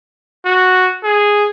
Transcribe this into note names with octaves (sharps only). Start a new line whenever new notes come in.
F#4
G#4